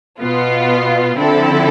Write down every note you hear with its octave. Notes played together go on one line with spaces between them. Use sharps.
B2 B3 F4
D3 F3 C4 E4 A4